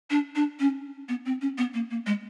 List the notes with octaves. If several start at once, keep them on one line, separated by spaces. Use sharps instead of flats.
D4
D4
C#4
B3
C4
C#4
B3
A#3
A#3
G#3